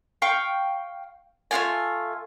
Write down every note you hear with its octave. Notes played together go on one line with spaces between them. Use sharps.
F5 G5 C#6
A3 A#3 F4 G#5